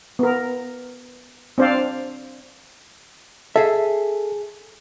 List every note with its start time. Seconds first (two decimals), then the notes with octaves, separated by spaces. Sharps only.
0.19 B3 A#4
1.58 C4 D4 C5 D5 F5
3.56 G#4 A4 E5